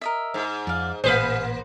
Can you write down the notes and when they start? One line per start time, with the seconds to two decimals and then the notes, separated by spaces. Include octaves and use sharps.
0.01 A#4 D#5 E5
0.34 G#2
0.67 F2 D5 F5
1.04 A1 A#2 A#3 G#4 B4 C5 F5